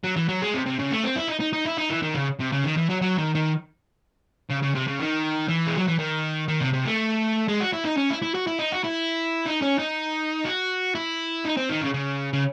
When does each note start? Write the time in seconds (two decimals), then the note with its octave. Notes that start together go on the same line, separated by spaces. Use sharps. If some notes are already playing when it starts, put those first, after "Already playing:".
0.04 F#3
0.16 E3
0.29 F#3
0.42 G#3
0.54 C3
0.66 C3
0.79 C#3
0.91 A3
1.03 C4
1.16 E4
1.28 D#4
1.40 D#4
1.53 D#4
1.65 E4
1.78 D#4
1.90 E3
2.03 D#3
2.15 C#3
2.40 C3
2.52 C#3
2.64 D#3
2.77 E3
2.89 F#3
3.01 F#3
3.18 D#3
3.35 D#3
4.50 C#3
4.63 C#3
4.75 C3
4.88 C#3
5.00 D#3
5.49 E3
5.67 G#3
5.78 F#3
5.88 E3
5.99 D#3
6.48 D#3
6.61 C3
6.74 C3
6.86 A3
7.48 G#3
7.60 F#4
7.73 E4
7.85 D#4
7.97 C#4
8.10 E4
8.22 E4
8.35 F#4
8.47 E4
8.59 D#4
8.72 F#4
8.84 E4
9.47 D#4
9.62 C#4
9.79 D#4
10.45 F#4
10.95 E4
11.45 D#4
11.57 C4
11.69 D#3
11.81 C#3
11.94 C#3
12.33 C#3